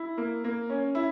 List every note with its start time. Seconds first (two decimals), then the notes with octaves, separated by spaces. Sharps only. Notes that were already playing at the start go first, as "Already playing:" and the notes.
Already playing: E4
0.17 A#3
0.44 A#3
0.70 C#4
0.95 E4